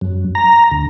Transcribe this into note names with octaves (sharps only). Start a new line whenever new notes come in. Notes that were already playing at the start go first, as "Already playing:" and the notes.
F#2
A#5
D2